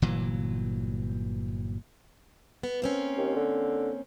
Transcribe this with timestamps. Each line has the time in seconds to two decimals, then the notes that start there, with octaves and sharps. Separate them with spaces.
0.02 G1 A#2 E3 F#3
2.63 B3
2.82 A#3 C4 C#4
3.17 D#2
3.36 D3